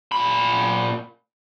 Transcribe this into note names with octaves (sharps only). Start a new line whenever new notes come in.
A#2 B5